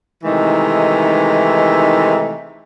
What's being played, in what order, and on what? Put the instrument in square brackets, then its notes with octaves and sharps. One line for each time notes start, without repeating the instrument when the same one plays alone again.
[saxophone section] C3 D#3 E3 G#3 A3 D#4